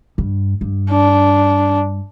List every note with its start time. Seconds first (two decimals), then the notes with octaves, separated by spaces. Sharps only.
0.18 G2
0.61 G2
0.91 D4